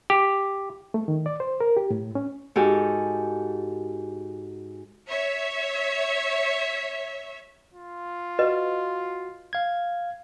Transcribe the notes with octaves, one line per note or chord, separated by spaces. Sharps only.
G4
A3
D#3
D5
C5
A#4
G4
A2
C#4
G#2 F#4 G4 A4 G#5 F6
C#5 E5
F4
F#4 B4 D#5
F5 G#6